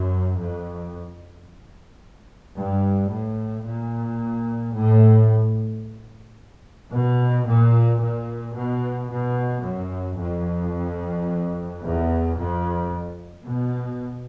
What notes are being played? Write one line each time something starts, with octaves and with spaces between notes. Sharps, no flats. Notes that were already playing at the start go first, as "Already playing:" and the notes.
Already playing: F#2
F2
G2
A2
A#2
A2
B2
A#2
A#2
B2
B2
F#2
F2
E2
F2
B2